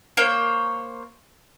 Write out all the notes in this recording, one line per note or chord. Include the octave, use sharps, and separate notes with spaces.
A#3 C5 C#5